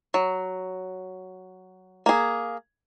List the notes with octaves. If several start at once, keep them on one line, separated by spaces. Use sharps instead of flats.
F#3
A#3 G#4